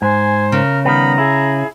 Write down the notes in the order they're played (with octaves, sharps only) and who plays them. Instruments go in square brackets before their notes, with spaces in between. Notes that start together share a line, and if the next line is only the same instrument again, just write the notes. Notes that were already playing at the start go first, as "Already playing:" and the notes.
[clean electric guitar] G#2 [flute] C5 [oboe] G#5
[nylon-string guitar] C#3 [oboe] A#4
[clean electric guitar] D#3 G3 B3 [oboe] A#5 [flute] B5
[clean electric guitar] E4 [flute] G#4